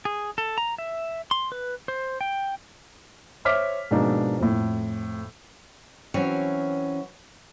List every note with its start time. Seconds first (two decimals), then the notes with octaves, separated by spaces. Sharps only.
0.05 G#4
0.38 A4
0.58 A#5
0.78 E5
1.31 C6
1.52 B4
1.88 C5
2.21 G5
3.45 C5 C#5 E5 D6 F6 B6
3.91 G#2 B2 F3 A#3 D4 D#4
4.39 F2 A2
6.14 E3 F#3 C4 C#4 C#5